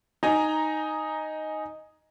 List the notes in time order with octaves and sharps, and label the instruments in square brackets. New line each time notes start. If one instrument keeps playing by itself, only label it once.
[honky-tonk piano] D#4 G#5 A#5